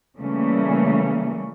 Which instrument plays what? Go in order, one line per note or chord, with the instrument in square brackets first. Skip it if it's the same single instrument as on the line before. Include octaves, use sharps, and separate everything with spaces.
[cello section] C#3 E3 G3 A3 A#3 C#4